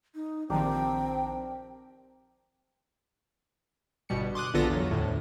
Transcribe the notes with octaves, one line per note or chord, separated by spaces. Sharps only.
D#4
A#1 D#3 F3 C4 D4 G4 A#4 G5
G1 B2 G3 C#7
C6 D6 D#6 F#6
A#1 D3 B3 F4 A4 A#6
E2 F#3
D2 A2